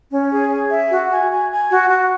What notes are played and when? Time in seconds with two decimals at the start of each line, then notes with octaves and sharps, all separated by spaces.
0.11 C#4
0.31 G#4
0.51 G#5
0.71 E5
0.91 F#4
1.11 G#5
1.31 G#5
1.50 G#5
1.70 F#4
1.90 F#4